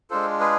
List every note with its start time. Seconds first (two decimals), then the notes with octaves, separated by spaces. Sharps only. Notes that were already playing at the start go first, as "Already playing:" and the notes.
0.10 G#3 D4 F4 A4 C5
0.40 G#4 B4